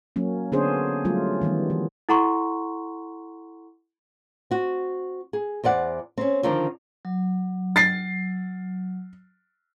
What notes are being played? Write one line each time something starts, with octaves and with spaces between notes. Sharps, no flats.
F#3 A#3 C#4
D3 B3 C#4 D4 G#4 C5
F#3 G3 A3 F4
D#3 E3 G3 B3
E3
E4 A4 F#5 A#5 C6 C#6
C4 F#4
G#4
E2 C5 D5 F#5
C4 C#4
D3 D#3 F3 C4 D4
F#3
A6 C7